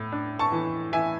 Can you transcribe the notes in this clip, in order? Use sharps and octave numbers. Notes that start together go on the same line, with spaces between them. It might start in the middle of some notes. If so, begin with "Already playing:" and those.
Already playing: A2
D4
A5 C#6
E3
E3 E5 G#5